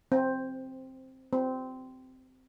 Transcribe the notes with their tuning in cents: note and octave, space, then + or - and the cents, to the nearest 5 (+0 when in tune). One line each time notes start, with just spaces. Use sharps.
C4 +5
C4 -15